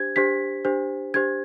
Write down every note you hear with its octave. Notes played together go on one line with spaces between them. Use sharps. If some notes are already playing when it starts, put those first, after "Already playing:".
Already playing: D4 G4 C5 G#6
D4 G4 C5 B6
D4 G4 C5
D4 G4 C5 G#6